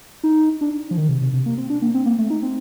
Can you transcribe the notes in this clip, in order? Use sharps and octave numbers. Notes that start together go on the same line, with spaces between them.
D#4
D4
F3
D#3
C3
C3
C3
A#3
C4
D4
A#3
C4
A#3
A3
D#4
C4